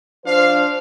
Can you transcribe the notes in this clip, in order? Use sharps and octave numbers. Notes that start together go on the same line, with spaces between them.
F3 D4 C5 F5